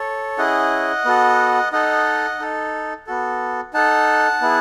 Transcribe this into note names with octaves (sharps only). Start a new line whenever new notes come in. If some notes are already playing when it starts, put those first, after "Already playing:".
Already playing: A4 C#5
C#4 E4 G#4 D#5 F#5
B3 F#4 A4
D#4 A4 D#5 F#5
D#4 A4
B3 F#4 A4
D#4 A4 F#5 A5
B3 E4 G#4